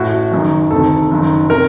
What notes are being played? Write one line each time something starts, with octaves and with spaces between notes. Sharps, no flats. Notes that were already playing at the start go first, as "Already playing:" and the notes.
Already playing: A1 A2 F#4
F#1 F#2 D#3
D2 C3 D#3 A4
F#1 F#2 D#3
C3 D#3 A#4